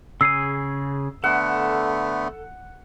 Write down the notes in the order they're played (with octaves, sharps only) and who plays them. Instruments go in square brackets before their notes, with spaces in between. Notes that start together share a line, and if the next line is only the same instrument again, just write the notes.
[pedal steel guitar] C#3 G#4 D#6 [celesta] E6 C7
[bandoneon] D3 A3 B3 [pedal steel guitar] A4 [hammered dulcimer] F#5